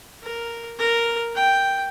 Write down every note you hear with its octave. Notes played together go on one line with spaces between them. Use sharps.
A#4
A#4
G5